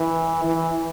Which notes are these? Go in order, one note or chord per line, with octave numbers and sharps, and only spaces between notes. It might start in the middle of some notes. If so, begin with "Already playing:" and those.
Already playing: E3
E3